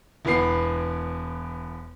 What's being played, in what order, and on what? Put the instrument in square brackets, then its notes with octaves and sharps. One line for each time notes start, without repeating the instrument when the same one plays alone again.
[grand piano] E1 E3 B3 C7